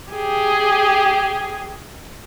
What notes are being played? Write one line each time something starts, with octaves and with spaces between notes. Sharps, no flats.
G4 G#4